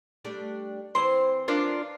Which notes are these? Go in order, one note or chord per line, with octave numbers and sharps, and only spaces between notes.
G3 A3 D4
E3 C4 C5 C6
D4 F4 A#4